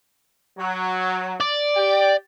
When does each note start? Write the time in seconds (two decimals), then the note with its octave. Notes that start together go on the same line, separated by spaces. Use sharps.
0.59 F#3
1.40 D5
1.76 G4 G5